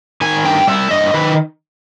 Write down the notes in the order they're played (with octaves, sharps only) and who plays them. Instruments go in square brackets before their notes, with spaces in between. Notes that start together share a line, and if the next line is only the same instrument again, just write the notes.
[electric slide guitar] D#3 G#5
G2 G5
G3 E5
G2 D#5
D#3 B4